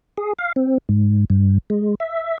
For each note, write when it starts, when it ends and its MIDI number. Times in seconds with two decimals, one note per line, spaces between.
0.18 0.33 68
0.39 0.52 77
0.56 0.78 60
0.89 1.25 44
1.30 1.58 43
1.70 1.95 56
2.00 2.38 76